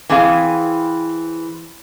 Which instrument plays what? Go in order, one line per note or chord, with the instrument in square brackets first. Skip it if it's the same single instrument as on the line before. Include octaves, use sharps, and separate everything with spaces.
[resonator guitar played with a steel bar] E3 C4 G#4 F5